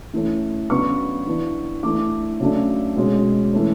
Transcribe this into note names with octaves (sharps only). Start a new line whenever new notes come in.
E3 A3 C#4
C#3 F#3 B3 D4 C#6
E3 B3 D4
E3 A3 D4 D6
C#3 F#3 A3 D4
B2 G#3 C#4
E3 A3 C#4